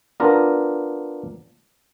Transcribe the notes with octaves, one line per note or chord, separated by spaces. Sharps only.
B3 D4 F4 A#4